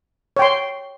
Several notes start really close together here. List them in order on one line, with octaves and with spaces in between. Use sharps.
C#5 G5 C6